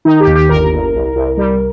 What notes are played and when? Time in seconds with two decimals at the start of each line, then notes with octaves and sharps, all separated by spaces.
0.05 D#3 D#4
0.20 G4
0.27 D#2
0.35 G4
0.49 G1 A#4
0.72 G1
0.93 C2
1.16 C2
1.37 G3